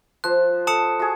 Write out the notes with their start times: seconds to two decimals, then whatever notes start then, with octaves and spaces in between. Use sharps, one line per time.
0.24 F3 C5 F#6
0.67 A4 A5 D#6 C#7
0.99 F#4 G#4